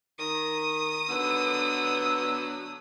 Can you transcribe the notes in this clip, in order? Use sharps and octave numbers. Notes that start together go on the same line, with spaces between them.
D#3 D#6
D3 F#3 B3 E6